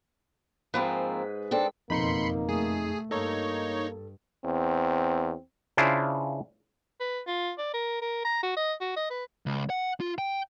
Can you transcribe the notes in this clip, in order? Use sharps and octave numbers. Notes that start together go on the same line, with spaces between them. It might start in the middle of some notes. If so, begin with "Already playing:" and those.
G#2 F3 A#3 C4 B4
C4 D4 A4
F#1 F2 B2 A#3 D#4 B5 C6 C#7
A3 G#4
G2 A#3 D#4 A4 C#5
E2 C4
C#3 D4 E4 F4 C5
B4
F4
D5
A#4
A#4
A#5
F#4
D#5
F#4
D#5
B4
C#2
F#5
F4
G5